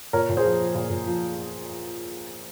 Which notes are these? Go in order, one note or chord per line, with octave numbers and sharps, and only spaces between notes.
A#2 A#4 C#5
A#2
G#4 C5
F3
F3
A#2
A#2
F3